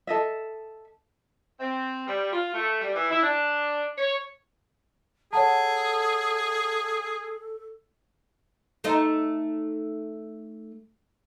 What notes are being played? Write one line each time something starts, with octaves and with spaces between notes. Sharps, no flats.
A4 D#5 E5
C4
G3
F4
A3
G3
E3
E4
D4
C#5
G#4 A4 C#5 F#5 A5
A3 D#4 C5